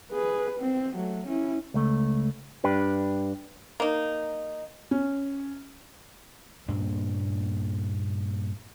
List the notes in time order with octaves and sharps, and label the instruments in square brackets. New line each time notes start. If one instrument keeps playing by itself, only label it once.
[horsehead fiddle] G#4 B4
C4
F#3 A3
C#4 E4
[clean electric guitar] C#2 A3
G2 D4 G4 B4
[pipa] A#3 D#4
[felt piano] C#4
[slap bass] G2 A#2 A#3 D4